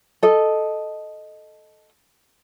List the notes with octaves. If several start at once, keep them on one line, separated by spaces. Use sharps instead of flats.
A4 D#5